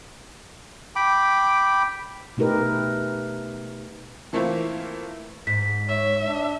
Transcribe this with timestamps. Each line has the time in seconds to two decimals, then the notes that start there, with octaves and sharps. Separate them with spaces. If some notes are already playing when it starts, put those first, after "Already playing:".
0.96 G5 B5 D6
2.37 B2 A3 D#4 G4 A#4 B4
4.33 E3 A3 A#3 C4 E4 F4
5.47 G#2 B6
5.89 C#5 E5
6.26 D4